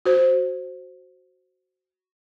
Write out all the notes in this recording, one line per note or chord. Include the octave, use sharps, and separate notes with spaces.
F#4 C5